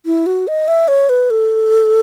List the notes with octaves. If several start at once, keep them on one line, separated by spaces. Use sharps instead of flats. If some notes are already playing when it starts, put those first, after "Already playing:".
E4
F#4
D#5
E5
C#5
B4
A4